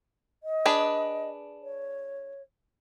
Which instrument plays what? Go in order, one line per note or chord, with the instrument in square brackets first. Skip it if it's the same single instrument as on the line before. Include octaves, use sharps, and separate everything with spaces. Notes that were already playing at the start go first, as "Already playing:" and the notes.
[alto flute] D#5
[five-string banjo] D4 G#4 B4
[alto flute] C#5